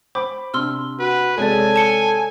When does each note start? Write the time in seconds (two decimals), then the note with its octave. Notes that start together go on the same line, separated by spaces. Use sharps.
0.15 C5 B5 D6
0.54 C3 D4 C6 E6 F6
0.99 F#4 B4
1.38 C3 G#3 A4 C#5 D5 G#5
1.76 A5 C#7 G7